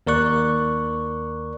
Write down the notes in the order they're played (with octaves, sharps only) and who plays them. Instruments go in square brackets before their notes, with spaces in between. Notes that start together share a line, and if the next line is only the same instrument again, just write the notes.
[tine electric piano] D#2 A#4 D5 C#6 F#6